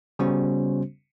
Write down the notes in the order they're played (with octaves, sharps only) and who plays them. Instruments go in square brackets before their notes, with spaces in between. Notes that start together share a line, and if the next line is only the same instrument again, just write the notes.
[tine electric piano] C#3 G3 B3 C#4 F#4 C5